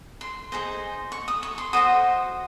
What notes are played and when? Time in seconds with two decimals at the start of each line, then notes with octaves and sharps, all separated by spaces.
0.21 C6
0.52 D#4 G#4 C5 D#5
1.12 C#6
1.28 D#6
1.43 C#6
1.58 C6
1.73 F#4 C5 D#5 D#6